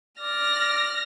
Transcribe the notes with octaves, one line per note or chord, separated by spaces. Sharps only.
D5 F6 A#6